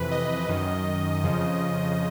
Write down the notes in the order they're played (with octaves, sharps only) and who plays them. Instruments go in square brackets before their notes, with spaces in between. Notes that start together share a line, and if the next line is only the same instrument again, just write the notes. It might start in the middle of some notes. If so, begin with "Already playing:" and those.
Already playing: [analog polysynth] F2 C3 E3 B4
D#5
F#2 D#3
F2 C#3 F3